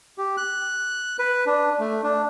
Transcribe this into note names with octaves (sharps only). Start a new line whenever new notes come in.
G4
F#6
B4
D4
A3
D4